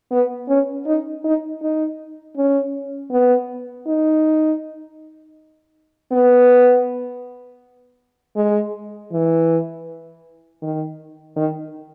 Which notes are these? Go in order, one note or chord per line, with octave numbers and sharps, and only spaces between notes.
B3
C#4
D#4
D#4
D#4
C#4
B3
D#4
B3
G#3
E3
D#3
D#3